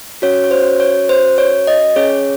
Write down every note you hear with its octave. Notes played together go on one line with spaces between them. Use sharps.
C#4 F#4 C#5
C#5
C5
C#5
C5
C#5
D#5
C#4 G#4 C#5